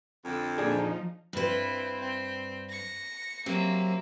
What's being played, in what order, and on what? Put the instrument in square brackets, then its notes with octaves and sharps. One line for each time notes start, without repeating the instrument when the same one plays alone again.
[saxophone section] F2 D3
[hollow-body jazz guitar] A#2 D4 G#4 [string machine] F3 D#4
[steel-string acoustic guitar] G2 B4 [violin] C4 E4
[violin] C4
A#6 C#7
[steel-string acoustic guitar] C3 F#3 C4 [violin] A#3 E5